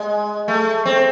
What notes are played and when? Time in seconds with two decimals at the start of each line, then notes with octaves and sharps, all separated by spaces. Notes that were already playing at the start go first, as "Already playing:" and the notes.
Already playing: G#3
0.48 A3
0.85 C4